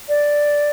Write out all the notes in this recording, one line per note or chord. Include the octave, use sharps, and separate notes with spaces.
D5